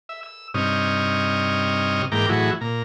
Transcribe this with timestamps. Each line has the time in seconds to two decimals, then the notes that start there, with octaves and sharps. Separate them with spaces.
0.09 E5
0.23 E6
0.54 G2 C3 D#4 C#5 D#6 F6
2.12 G#2 E3 A#3 G5 A#5 D6
2.29 A2 E3 F#3 E4 F#4 G#4
2.61 A#2 A#5